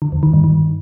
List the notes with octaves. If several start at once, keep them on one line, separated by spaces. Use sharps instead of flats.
D3
E2
D#3
G2
D#3